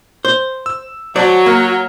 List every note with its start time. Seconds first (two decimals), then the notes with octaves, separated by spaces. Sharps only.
0.25 C5
0.66 E6
1.16 F#3 F#4 C5 D5 A5
1.46 A#3 A#5 F6